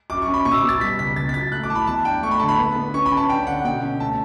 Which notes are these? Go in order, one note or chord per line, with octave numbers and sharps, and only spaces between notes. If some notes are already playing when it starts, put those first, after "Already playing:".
F#2 D6
C#6
C#4
B5
B2 C#6
E6
D6
B2
A6
G3 B6
C#2 B6
C#2 A6
B6
F#3 A6
A3 F#6
D6
E3 A5
B5
E2 A5
D4 G5
A3 C#6
B5
D3 A5
B5
B3
B3
C#4 C#6
B5
C#4
A5
D4 G5
D3 F#5
B2 G5
C#4
A3 A5